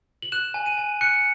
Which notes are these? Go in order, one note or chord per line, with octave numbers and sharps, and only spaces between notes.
F#7
F#6 E7
G#5
D#7
G#5
F#6 C#7